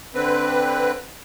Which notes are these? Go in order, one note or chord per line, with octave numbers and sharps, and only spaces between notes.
D3 C4 B4